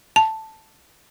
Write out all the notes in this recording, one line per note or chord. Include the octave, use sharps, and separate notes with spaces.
A5